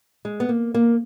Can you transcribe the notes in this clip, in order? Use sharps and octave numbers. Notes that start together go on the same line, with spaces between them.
G#3
B3
A#3
A#3